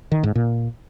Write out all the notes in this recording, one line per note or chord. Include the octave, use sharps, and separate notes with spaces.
D#3
G#2
A#2